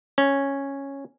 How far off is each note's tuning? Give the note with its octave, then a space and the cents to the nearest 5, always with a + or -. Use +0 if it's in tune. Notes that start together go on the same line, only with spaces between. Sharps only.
C#4 -5